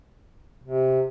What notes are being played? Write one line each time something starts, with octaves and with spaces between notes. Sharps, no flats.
C3